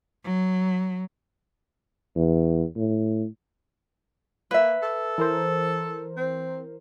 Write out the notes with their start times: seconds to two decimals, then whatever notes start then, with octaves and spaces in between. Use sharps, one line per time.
0.24 F#3
2.16 E2
2.76 A2
4.51 A#3 B4 E5
4.82 A4
5.18 E3 A#4 C5
6.17 C4